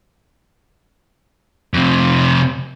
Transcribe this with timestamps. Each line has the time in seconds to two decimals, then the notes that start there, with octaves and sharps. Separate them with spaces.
1.74 F2 C3